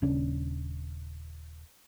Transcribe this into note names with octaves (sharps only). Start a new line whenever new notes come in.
D#1 C#3 C#4 D4